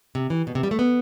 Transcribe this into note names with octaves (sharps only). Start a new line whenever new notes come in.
C3
E3
B2
C3
G3
A3
B3